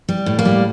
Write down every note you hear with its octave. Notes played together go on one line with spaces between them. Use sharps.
G3
A2
A#3
G3